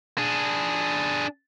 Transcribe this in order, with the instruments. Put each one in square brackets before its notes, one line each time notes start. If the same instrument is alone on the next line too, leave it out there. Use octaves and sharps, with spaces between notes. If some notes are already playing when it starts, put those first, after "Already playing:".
[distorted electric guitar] D4 G#4